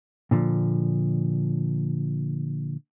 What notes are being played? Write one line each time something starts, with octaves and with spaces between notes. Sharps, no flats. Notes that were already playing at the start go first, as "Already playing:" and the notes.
A#2 D3 F3